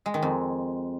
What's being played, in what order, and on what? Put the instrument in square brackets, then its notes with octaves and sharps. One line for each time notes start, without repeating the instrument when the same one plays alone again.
[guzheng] G#3
D#3
F2